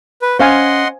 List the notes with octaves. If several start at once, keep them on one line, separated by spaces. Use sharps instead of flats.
B4
C#4 C5 D#5 F5 F#5 G#5 C6